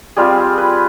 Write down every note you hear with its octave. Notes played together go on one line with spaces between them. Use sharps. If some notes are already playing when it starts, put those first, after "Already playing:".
G3 C4 F4 G#4
B4